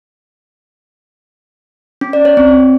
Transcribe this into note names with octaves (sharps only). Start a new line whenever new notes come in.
C#4
D5
C#5
C4